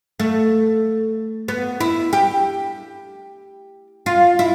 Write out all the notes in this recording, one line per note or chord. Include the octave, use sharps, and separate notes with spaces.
A3
B3
E4
G4
F4
E4